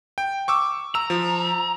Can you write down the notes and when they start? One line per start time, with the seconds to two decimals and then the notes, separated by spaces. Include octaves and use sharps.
0.18 G5
0.48 C#6 D6 E6
0.95 A#5 E6
1.10 F3